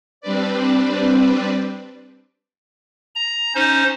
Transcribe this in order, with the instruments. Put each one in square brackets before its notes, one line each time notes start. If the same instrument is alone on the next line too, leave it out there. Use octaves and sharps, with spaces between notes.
[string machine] G3 C4 D4 B4 D5
[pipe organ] A#5
C#4 D#4 C5